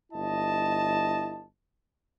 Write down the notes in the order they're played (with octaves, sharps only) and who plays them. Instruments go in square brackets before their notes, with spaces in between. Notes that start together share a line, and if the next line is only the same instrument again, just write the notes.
[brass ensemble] G1 E4 D#5 A5